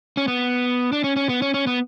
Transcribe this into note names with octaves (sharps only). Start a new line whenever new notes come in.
C#4
B3
D4
C#4
C#4
B3
C#4
C#4
B3